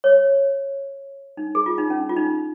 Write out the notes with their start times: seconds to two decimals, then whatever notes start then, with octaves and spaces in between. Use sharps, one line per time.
0.04 C#5
1.37 D#4
1.55 G#4
1.66 F4
1.78 D#4
1.90 C#4
2.09 F4
2.17 D#4